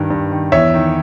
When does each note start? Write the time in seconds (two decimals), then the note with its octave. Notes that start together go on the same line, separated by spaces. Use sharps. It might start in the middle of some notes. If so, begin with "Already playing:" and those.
Already playing: G2 D#3
0.10 G2
0.31 D#3
0.52 E2 C#5 E5
0.74 D#3